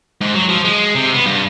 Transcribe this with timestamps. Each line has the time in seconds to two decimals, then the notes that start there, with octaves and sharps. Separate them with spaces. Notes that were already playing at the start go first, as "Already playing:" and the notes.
0.21 G#2
0.35 F#3
0.49 F3
0.65 G#3
0.95 C3
1.14 B3
1.26 G2